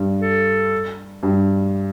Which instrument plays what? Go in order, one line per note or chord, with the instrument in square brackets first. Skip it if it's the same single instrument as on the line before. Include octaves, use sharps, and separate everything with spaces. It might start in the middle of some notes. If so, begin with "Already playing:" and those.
Already playing: [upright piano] G2
[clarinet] A4
[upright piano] G2